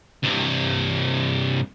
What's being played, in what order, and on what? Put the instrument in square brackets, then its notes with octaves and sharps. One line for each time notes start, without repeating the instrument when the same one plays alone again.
[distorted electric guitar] C2 G2